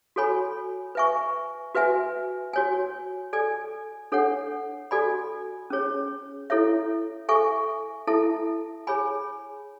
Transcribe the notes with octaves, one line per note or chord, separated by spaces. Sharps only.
F#4 A4 C#5 G#5 B5
B4 E5 G#5 C#6
F#4 B4 E5 G#5
F#4 C#5 G#5
A4 D5 G#5
D4 A4 C#5 F#5
F#4 A4 D5 G#5 B5
C#4 G#4 C#5
E4 A4 C#5 E5
A4 E5 G#5 C#6
E4 A4 E5 A5
G#4 C#5 G#5 B5